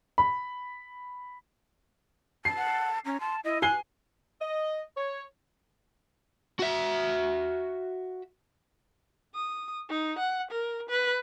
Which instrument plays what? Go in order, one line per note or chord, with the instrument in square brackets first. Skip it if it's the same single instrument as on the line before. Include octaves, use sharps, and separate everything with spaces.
[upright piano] B5
[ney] A5 [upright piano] C7
[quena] F#5
[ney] C#4 [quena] A#5
[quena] A5 [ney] C6
[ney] E4 [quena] D#5
[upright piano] G#5 C7 G7 [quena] F#6
[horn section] D#5
C#5
[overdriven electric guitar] F#4 E5
[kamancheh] D#6
D#4
F#5
A#4
B4